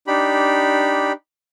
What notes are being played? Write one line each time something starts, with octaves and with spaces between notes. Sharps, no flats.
D4 D#4 G4 B5